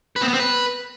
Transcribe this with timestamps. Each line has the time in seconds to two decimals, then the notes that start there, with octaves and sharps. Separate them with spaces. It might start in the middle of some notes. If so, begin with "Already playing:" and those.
0.16 B4
0.22 C4
0.28 B3
0.34 C4
0.40 B4